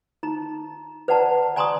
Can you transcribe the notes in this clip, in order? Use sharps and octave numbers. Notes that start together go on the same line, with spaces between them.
D#4 A#5
B4 D5 F#5 A5 A#5
D5 G#5 A#5 C6 C#6 D#6